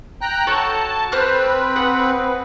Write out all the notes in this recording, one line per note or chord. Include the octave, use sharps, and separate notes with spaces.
G5 A#5 F#6
F#4 A4 C#5 A5
C4 B4 C5 F6 F#6
G#4 F#5